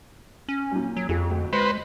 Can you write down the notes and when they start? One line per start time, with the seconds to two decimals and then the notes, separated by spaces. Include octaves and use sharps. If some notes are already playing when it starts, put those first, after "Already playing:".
0.49 C#4
0.72 F#2 A#2
0.97 F#3
1.09 F2 F4 G#4
1.30 D2
1.53 G#3 B4 C5